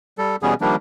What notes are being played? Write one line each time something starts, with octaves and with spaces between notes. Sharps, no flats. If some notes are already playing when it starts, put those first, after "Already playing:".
G3 A4
B2 E3 G3 B3 C#4 G#4
D#3 F3 G3 A#3 D4